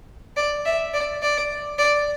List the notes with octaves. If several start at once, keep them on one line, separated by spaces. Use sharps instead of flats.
D5
E5
D5
D5
D5